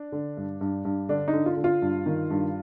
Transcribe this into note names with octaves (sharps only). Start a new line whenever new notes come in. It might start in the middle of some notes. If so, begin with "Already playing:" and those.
Already playing: D4
D3
G2
G2
G2
D3 D4
D#4
D3
F4
D3
F4
G2
D#3
G2